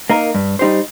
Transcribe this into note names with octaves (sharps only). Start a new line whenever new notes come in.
A#3 D#4 A#4
G2
G3 D#4 G4 C5